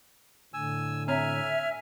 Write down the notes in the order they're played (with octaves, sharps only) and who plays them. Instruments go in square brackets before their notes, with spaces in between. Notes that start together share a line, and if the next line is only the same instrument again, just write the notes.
[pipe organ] A2 D3 [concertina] G#5 E6
[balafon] C4 C#5 A#5 [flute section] E5 [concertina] G#5 F6